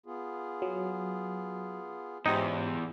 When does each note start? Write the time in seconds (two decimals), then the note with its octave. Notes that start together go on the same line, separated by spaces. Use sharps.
0.06 B3 F4 G#4
0.62 F#3
2.26 E2 G#2 C#4 D#4 F4 G4 C5